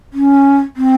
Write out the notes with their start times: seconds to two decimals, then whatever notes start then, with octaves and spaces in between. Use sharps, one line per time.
0.13 C#4
0.77 C4